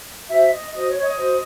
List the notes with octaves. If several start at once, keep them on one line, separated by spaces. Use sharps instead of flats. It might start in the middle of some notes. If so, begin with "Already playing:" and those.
F#4 C5 E5
D#5
F#4 C5 D#5
C#5
C#5
D#5
F#4 C5